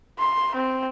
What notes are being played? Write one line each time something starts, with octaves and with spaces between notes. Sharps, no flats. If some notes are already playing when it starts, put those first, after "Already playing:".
C6
C4